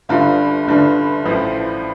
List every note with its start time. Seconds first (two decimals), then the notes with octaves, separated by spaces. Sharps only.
0.09 G1 G2 D3 F4
0.67 G1 G2 D3
1.25 A1 A2 F3